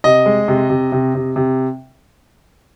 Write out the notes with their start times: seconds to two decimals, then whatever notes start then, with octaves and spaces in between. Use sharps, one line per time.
0.04 C3 D#5
0.26 G#3
0.48 C3
0.70 C3
0.92 C3
1.15 C3
1.36 C3